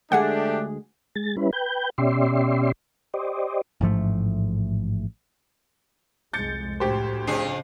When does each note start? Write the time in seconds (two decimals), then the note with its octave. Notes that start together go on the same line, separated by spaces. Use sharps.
0.12 D2 G#3 A3 D4 G4 G#4 F#5
1.16 G#3 A6
1.37 G3 C#4 E4 B4
1.53 B4 G5 G6
1.98 B2 C#4 G4 D5 E5 C6
3.14 G4 C5 D5 D#5
3.81 A1 G#2 F3 A3
6.33 C2 F2 G#3 G6 A6 C#7
6.80 D2 A2 G4 C5
7.27 F2 C#3 D4 G#4